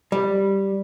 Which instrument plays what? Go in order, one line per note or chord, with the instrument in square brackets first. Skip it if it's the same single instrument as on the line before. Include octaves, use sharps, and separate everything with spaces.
[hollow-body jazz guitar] G3